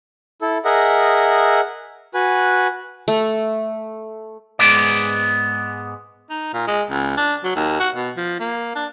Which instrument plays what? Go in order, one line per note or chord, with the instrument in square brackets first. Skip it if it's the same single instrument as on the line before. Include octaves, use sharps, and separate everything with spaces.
[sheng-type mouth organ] E4 A4
G#4 A#4 D#5 E5 F#5
F#4 B4 G#5
[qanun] A3
[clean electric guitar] G#2 C#3 G#3 B3 D5
[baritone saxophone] D#4
A#2
G#3
C#2
D4
F#3
D#2
F#4
B2
F3
A#3
D4